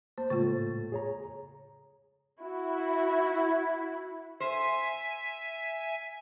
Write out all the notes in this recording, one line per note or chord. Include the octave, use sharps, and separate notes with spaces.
A#3 C5
A2 C#3 G#3 F4 A4 A6
G#4 C#5 A#5
E4 F#4
C5 E5 G#5